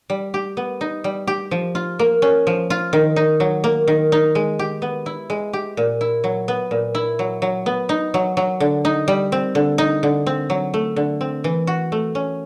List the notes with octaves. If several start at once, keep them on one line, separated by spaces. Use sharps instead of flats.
G3
G4
B3
D#4
G3
G4
F3
F4
A#3
C#4
F3
F4
D#3
D#4
F#3
A#3
D#3
D#4
G#3
G4
B3
E4
G#3
G4
A#2
E4
F#3
B3
A#2
E4
F#3
F#3
B3
D#4
F#3
F#3
D3
D#4
G3
C4
D3
D#4
D3
C4
F#3
A3
D3
C4
E3
F#4
A3
C#4